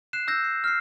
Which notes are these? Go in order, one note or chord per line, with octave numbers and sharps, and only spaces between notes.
F#6 C7 E7
E6 G6 A#6
C7
F6 C7